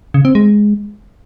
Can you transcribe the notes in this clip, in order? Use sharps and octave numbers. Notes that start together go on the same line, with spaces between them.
C#3
C4
G#3